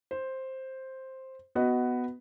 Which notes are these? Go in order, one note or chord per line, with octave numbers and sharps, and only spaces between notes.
C5
B3 F#4 B4 D#5 F#5